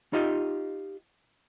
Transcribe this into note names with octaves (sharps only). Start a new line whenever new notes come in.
D#4 F4 G4 D#5